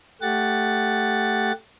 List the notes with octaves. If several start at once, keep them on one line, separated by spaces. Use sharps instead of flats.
A3 G4 F#5 A6